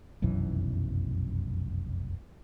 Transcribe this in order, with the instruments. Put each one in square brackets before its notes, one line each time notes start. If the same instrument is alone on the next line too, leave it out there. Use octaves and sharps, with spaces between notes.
[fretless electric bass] F1 B1 F#2 E3